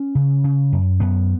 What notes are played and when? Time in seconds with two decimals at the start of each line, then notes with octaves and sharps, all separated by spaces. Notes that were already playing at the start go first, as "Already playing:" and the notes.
Already playing: C#4
0.15 C#3
0.44 C#3
0.72 F#2
1.00 F#2 B3